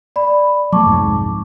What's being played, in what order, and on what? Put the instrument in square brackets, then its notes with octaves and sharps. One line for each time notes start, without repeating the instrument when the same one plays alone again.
[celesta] D5 B5
[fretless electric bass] F#3 G#3 A3 [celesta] A5 C#6 D6
[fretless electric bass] C2 F2 G#2